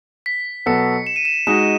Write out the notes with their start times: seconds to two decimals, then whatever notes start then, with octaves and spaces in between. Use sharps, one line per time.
0.26 B6
0.66 B2 F#3 B3 F#4 A4 C#7
1.07 E7
1.16 D#7
1.25 E7
1.47 G#3 D#4 F#4 E7